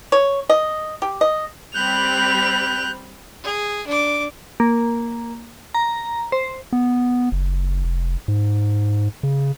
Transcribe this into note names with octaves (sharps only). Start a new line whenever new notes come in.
C#5
D#5
G4
D#5
G3 C4 B5 F#6 G6 F7
G#4
D4 D6
A#3
A#5
C5
B3
F#1
F1
G#2
C#3